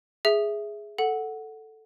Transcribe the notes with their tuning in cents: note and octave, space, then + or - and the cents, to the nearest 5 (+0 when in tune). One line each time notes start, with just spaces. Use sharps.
G#4 +0 E5 +0
A4 +0 F#5 +0